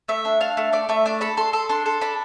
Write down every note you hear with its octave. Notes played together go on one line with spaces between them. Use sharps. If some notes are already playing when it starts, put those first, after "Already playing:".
A3 E5
D4
D4 F5
A3
A3 D5
A3 E5
D4 D5
A4 B5
A4 C6
A4
D4 C6
A4
D4 B5